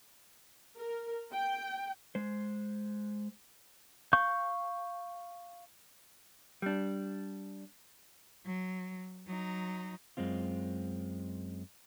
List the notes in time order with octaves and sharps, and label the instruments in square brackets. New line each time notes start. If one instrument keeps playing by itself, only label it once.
[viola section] A#4
G5
[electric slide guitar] G#3 C5
[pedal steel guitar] F5 C#6 G6
[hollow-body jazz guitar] G3 D4
[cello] F#3
F#3 D#4
[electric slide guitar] F#2 G#3 C4 F4